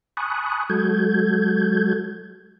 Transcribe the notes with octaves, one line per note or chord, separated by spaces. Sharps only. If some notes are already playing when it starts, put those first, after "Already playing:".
G#5 A5 B5 C#6 D#6 F#6
F#3 G#3 F#4 A4 G6 G#6